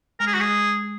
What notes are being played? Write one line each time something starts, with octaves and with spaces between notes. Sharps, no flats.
G#3 A#4
G#4
F#4
G#3 G#4